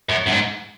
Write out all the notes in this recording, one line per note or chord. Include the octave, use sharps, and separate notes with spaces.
F#2
F#2
G#2